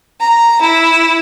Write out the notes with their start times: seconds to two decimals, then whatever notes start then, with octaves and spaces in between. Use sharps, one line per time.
0.19 A#5
0.60 E4